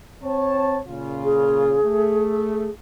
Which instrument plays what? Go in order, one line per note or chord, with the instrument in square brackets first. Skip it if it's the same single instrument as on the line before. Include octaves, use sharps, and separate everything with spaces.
[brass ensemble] C4 C#5 A5
A#2 C#3 F4
[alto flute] G#4
[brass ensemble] A3